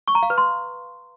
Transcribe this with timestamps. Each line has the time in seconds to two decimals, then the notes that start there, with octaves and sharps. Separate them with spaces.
0.08 C#6
0.15 A#5
0.23 F5
0.30 B4
0.38 C6